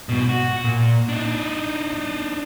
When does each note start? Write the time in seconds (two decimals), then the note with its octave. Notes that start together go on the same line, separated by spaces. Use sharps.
0.09 G#2 B2
0.29 F#4
0.64 A#2
1.08 D4 D#4